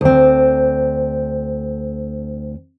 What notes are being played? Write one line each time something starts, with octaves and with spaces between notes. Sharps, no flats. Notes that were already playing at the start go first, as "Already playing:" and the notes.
D2 C4